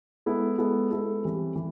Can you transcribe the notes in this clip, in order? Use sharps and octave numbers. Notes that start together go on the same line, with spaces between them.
G#3 B3 E4 A4
G#3 B3 E4 A4
G#3 B3 E4 A4
E3 G3 C4
E3